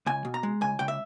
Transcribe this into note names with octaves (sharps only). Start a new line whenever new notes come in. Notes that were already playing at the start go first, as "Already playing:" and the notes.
C#2 G#5
B2
A#5
G#3
C#2 G#5
C#2 G5
E5